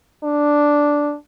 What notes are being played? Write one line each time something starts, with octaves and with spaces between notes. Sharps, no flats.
D4